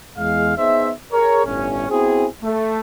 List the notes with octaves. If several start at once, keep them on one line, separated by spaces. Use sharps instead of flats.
E2 G#3 F5
B3 D#4 G#4 C5 E5
G#4 A#4 C#5
G1 A2 C#4
B3 C4 E4 F#4 G#4
A3